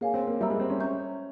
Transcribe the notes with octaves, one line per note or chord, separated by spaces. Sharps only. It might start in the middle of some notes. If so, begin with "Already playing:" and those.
A#3 G#4 C#5 F5 G#5
C4
A#3
G3 E5 A#5 E6
G#3
C4
C#4
E5 A#5 C#6 G6